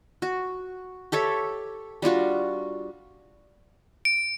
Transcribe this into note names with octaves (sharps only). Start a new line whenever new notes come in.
F#4
G4 A4 C#5 E5
G3 D4 F4 F#4
D7